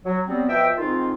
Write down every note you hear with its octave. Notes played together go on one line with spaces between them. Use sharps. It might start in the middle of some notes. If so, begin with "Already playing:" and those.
F#3
F#3 G3 B3 C4
B2 F3 E5 G5
G#2 D#3 C4 F4